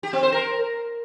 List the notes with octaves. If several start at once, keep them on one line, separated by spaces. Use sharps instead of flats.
G4
C4
C5
A#4